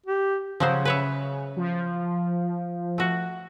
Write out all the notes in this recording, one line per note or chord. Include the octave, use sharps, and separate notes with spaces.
G4
C#3 F3 F#3 C5
B4 C#5 E5
F3
A3 F#4